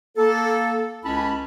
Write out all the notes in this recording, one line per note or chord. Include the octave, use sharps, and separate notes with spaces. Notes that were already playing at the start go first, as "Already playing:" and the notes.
A#3 A4
C#2 G#3 C#4 E4 A5 B5